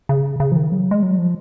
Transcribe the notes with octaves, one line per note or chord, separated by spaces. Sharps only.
C#3
C#3
F3
D#3
F#3
G#3
F#3
F3